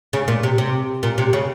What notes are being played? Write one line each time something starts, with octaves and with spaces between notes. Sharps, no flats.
C#3
A#2
C3
C3
A#2
C3
C#3